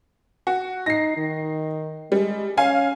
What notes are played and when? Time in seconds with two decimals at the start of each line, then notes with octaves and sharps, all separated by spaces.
0.47 F#4
0.86 D#4 A#6 C7
1.17 D#3
2.12 G3 G#3
2.58 C#4 F5 G#5